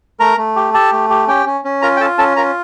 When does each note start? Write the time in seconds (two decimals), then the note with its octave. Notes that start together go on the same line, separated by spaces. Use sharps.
0.20 A3 A#4 A#5
0.38 A3
0.56 G4
0.74 G4 A4 A5
0.92 A3
1.10 G4
1.28 C#4 G4 G5
1.46 C#4
1.65 C#4
1.82 F4 A#4 A#5
1.97 G5
2.00 F4 A4 A5
2.18 C#4 A4 A5
2.36 F4 A#4 A#5